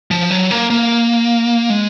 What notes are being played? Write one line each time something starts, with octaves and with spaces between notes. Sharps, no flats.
F3
F#3
A#3
A#3
G#3